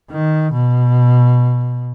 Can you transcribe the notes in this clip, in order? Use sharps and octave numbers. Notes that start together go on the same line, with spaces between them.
D#3
B2